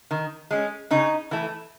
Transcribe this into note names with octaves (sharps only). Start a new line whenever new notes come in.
D#3
G#3 C#4
C#3 D#4
E3 A3